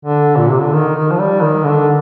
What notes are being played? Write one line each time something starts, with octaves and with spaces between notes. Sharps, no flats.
D3
A#2
C3
D3
D#3
D#3
F3
G3
D#3
D3